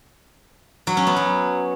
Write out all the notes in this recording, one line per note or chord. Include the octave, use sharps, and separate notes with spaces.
F#3
C#4
B3
F#3